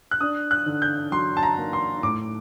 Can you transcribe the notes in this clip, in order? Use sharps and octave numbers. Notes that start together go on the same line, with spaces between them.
F#6
D4 D#6
F#6
D3
G6
F#3 C6
A5
A#5
A#3
C6
A2 D6